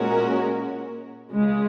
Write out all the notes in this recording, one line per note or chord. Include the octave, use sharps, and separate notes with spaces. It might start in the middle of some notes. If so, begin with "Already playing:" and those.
Already playing: A#2 G#3 C#4 F#4 A#4
C#2 C#3 G#3